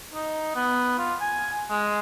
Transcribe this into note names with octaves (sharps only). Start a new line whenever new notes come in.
D#4
B3
F4
G#5
G#3